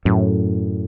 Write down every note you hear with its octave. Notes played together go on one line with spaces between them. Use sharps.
F#2 A2